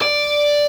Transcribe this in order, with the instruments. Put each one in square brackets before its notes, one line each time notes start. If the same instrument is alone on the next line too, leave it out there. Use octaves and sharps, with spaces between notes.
[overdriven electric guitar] D5